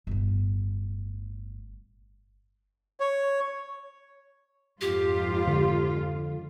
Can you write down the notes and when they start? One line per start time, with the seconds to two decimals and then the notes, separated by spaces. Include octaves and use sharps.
0.07 G1 A2
3.00 C#5
4.81 F2 G#2 F4 G4
5.47 D3